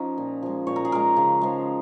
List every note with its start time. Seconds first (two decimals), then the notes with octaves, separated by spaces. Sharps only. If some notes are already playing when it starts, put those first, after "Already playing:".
Already playing: F3 C#4 D#4
0.18 A#2
0.43 F3 G#3
0.67 A#2 C#5
0.76 A#4
0.85 G#4
0.92 F3 G#3 A#4
1.17 C#3
1.41 F3 G#3